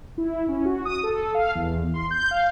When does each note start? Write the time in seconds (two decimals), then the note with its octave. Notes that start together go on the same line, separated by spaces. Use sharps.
0.18 E4
0.48 C#4
0.65 F#4
0.85 D#6
1.03 A4
1.34 F5
1.55 E2
1.94 C6
2.11 G6
2.31 F5